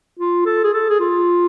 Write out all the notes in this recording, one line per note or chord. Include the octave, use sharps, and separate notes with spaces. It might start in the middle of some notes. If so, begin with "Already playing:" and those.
F4
A4
G#4
A4
G#4
F4